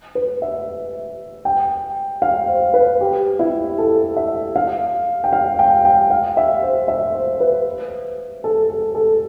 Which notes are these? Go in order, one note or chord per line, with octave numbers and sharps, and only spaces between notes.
B4
E5
G5
F5
C5
B4
G4
E4
A4
E5
F5
G5
F5
G5
G5
F5
E5
C5
E5
C5
B4
A4
A4
A4